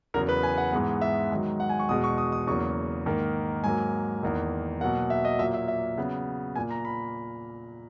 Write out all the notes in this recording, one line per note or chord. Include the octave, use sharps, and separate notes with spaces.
E2 C#3 F#3 A#4
B4
G#5
F#5
G#2 E3 G#3 B3
E5
G#2 D#3 F#3
F#5
G#5
C#6
E2 B2 G#3 D#6
C#6
D#6
D#6
E2 C#3 F#3 A#3 C#6
G#2 D#3 A#3
G#2 F#3 A#3 G#5
E2 D#3 A#3
B2 F#3 A#3 F#5
E5
D#5
A#2 F#3 A#3 E5
E5
E5
C#3 F#3 B3
A#2 A#3 G#5
A#5
B5